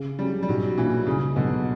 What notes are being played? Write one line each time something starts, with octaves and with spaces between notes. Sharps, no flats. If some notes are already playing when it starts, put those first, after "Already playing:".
Already playing: C#3
F#3 G3 C#4
G3
B1 F#3
A#2 E3 A#3 D4
C#2 C#3
B2 D3 F#3